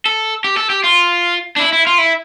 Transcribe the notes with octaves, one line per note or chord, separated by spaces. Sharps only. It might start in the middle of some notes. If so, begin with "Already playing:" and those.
A4
G4
A4
G4
F4
D4
E4
E4
F4
E4